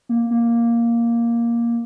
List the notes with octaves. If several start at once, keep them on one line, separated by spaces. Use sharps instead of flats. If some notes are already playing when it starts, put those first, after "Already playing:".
A#3
A#3